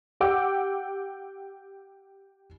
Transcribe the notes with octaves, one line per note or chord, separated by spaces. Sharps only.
G4 F#5 G5 D6 E6